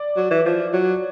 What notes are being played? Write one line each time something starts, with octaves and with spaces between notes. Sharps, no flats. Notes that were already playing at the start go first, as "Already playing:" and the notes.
Already playing: D5
F#3
E3
F3
F#3